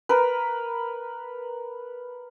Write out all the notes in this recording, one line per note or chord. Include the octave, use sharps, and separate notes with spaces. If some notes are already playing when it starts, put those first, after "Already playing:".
A#4 B4